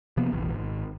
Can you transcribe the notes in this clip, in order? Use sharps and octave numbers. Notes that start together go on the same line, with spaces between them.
C3 F3 A#3 B3
F1 A#1 E3
G#1